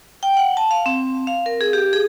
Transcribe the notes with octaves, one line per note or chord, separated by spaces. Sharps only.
G5
F#5
A5
F5
C4
F5
A#4
G#4
G4
G#4